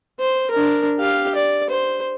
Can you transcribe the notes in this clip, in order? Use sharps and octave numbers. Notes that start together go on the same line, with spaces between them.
C5
D4 A#4
G4 F5
D5
C5